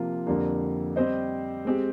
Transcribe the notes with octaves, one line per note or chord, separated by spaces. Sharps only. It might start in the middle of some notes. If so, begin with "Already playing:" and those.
Already playing: C3 F3 A#3 F4
F2 D3 G3 A#3
G3 C4 G4 C5 D#5
G#3 C4 G4